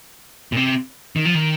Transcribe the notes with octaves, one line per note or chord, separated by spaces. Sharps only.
A#2
C3
D#3
F3
D#3